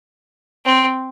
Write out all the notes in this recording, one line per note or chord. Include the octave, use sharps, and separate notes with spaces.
C4